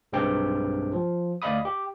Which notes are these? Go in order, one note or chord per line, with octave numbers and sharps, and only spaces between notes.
B1 G2 G#3 C4 G4 G5
F3
D2 D5 D#5 F5 B5 D#6
G4